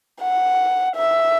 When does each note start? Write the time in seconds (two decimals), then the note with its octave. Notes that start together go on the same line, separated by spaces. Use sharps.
0.22 F#5
0.96 E5